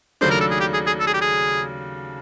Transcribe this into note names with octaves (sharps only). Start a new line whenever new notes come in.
D#2 C#3 F#3 A3 D4 C5
A#4
A4
G#4
G4
G#4
G#4
A4
G#4
G4
G#4